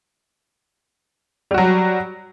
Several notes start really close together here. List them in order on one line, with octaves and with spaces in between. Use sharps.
G3 F#4 F#3